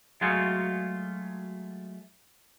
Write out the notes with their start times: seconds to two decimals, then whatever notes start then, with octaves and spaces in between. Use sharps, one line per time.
0.21 F#3 G#3 A3 F4 F#4 G#4